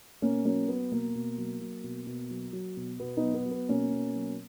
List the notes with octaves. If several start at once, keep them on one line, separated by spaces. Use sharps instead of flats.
B2 A#3 C#4
F#3 A#3 C#4
F#3 B3
B2 A#3
B2
F#3
F#3
B2
B2
F#3
F#3
B2
B2 B3
B3 D#4
F#3
B3
F#3
B3
B2 A#3 C#4
B2
F#3